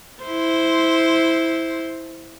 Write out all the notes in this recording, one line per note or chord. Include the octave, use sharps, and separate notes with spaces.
E4 C5